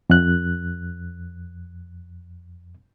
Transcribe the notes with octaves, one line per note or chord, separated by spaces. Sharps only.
F2 F#6